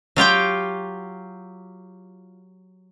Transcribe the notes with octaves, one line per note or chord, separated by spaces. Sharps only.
F#3 F4 G4 G5